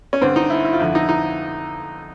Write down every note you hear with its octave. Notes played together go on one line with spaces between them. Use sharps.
C#4
G2 D3 C4
D#4
E4
E4
F4
F2 D3 E4
D#4
D#4